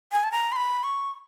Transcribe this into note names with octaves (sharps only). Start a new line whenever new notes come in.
G#5
A5
A#5
C6
B5
C#6